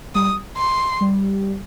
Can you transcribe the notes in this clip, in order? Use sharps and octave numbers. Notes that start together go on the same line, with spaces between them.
G3 D#6
C6
G3